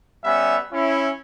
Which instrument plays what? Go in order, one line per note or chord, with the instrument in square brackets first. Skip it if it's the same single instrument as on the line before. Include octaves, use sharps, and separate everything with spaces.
[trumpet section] G3 B3 C#4 E5
C#4 E4